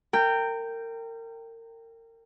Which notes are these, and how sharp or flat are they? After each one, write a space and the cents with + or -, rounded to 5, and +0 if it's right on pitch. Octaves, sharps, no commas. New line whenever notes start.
A#4 -30 G5 +0